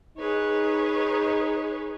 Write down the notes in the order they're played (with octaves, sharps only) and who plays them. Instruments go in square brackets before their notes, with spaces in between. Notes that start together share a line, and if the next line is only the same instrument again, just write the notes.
[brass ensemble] D#4 [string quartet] G#4 B4 C#5